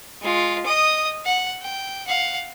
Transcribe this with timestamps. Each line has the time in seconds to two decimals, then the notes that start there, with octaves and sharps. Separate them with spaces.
0.22 G#3 F4
0.65 D#5 D#6
1.26 F#5
1.62 G5
2.07 F5 F#5